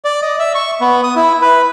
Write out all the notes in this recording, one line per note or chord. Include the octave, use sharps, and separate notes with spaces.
D5
D#5
E5
C#6
B3
D#6
E4
B4